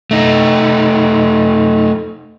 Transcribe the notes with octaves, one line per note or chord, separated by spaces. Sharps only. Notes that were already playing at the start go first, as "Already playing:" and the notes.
A3 D#4